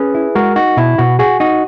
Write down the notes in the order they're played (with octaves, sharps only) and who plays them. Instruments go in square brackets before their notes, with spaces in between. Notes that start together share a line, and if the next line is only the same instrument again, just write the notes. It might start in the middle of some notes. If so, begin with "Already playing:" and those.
Already playing: [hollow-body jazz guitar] C#4 [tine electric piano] G#4 B4
[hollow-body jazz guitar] E4
[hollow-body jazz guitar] G#3 [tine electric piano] F#4 A#4
[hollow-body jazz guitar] D#4 [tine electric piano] F#4
[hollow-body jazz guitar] B2 [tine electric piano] E4
[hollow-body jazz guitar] B2 [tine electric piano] F#4
[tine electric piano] F#4 [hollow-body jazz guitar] G#4
[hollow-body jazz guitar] D#4 [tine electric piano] F#4